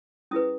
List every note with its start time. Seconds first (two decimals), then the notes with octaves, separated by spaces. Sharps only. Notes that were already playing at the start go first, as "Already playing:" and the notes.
0.31 C#4 E4 G#4 B4 D#6